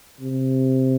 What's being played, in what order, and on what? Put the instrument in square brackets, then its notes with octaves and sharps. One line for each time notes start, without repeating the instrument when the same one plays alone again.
[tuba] C3